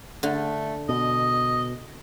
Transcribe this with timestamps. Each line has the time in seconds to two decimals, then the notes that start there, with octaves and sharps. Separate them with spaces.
0.23 D3 A3
0.89 B2 D#5